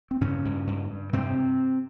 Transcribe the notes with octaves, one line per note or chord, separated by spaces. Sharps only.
C4
G2 C#3 C#4
G2
G2
G2
G2 C3 C4